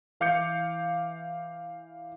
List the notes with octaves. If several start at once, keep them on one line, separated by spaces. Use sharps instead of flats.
E3 F5 D6 G6 C#7